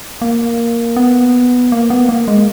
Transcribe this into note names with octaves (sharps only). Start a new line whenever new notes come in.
A#3
B3
A#3
B3
A#3
G#3